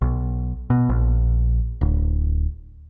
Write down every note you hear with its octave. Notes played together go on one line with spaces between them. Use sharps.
B1
B2
A#1
D1